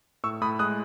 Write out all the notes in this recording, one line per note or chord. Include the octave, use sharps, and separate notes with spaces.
A2 C#6 E6
A2 B5 D#6
G#3 D#6 F#6